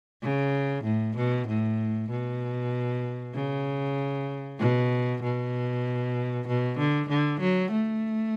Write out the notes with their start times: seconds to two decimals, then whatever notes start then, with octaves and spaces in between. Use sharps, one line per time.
0.23 C#3
0.84 A2
1.17 B2
1.48 A2
2.10 B2
3.34 C#3
4.60 B2
5.23 B2
6.48 B2
6.78 D3
7.10 D3
7.41 F#3
7.72 A3